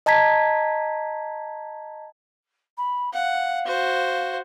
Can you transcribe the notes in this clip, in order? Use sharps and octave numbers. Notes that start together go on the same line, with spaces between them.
D#5 A5 A#5 G#6 B6
B5
F5 F#5
F#4 C5